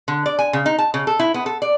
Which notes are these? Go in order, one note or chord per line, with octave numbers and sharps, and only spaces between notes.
D3
D5
G#5
C#3
D#4
A5
C#3
A4
E4
B3
A4
D5